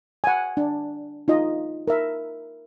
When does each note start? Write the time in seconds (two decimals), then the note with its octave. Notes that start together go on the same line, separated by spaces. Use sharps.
0.24 F#5 G#5
0.57 D4
1.28 D#4 F4 D#5
1.88 A#4 E5